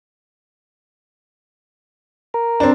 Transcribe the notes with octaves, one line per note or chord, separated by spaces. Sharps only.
A#4
C4 D4